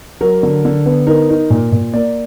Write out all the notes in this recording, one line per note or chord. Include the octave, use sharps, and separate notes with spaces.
F#3 A#4
D3
D3
B3
D#4 A#4
D#4
A#2
A#2
A#3 D5